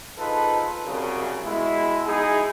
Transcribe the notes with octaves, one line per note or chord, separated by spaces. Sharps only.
D#4 F4 G#4 A4 B4 C5
C2 F#2 C#3
B2 G#3 E4
G#3 D#4 E4 G#4